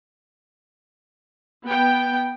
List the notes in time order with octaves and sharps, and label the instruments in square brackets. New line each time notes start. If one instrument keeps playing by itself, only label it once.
[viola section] B3 G5